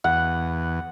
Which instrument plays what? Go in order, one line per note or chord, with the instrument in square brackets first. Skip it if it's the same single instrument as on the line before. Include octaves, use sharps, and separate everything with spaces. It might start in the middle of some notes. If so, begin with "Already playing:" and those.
[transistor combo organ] E2 [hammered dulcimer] F#5